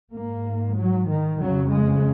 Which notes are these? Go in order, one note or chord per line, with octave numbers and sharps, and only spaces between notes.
G#2 A#3
F#3
D#3
F2 C#3 F#3
G#3